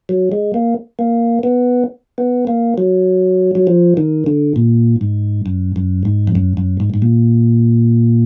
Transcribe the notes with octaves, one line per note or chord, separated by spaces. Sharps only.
F#3
G#3
A#3
A#3
B3
B3
A#3
F#3
F#3
F3
D#3
D3
A#2
G#2
F#2
F#2
G#2
F2
F#2
F#2
G#2
G#2
A#2